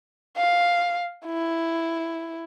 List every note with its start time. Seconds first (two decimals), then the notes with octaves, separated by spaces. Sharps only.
0.37 F5
1.26 E4